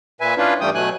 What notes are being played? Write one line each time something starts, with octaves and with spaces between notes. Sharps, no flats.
A#2 B4 E5 G#5
C#4 D4 E4 F4 B4
G2 E3 G3 A3 G5 D#6
B2 F#3 A3 G#5 F#6